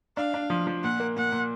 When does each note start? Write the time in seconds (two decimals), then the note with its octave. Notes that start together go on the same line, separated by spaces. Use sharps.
0.16 D4 F5
0.34 D4
0.50 F3
0.67 F3
0.83 A#2 F#5
1.00 A#3
1.17 A#2 F#5
1.32 A#2